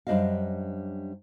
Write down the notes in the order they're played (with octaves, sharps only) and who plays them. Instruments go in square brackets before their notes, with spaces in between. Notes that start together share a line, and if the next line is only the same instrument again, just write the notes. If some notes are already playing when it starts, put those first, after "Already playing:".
[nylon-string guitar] F#2 G3 D4 C5 D#5 F5